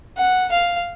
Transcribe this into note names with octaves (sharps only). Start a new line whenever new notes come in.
F#5
F5